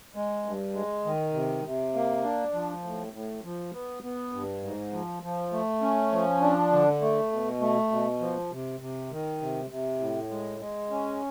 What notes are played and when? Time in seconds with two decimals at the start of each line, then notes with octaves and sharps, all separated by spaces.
0.16 G#3
0.46 G2
0.74 G#3
1.05 D#3
1.34 C3
1.65 C3
1.95 A#3
2.24 D4
2.54 F3
2.84 A2
3.13 A2
3.44 F3
3.73 B3
4.03 B3
4.32 G2
4.63 G#2
4.93 F3
5.23 F3
5.53 A3
5.82 C#4
6.12 F3
6.41 D4
6.72 D3
7.01 A3
7.32 B2
7.61 A3
7.91 B2
8.20 F3
8.51 C3
8.80 C3
9.11 D#3
9.41 C3
9.70 C3
10.00 A2
10.30 G#3
10.60 G#3
10.90 C#4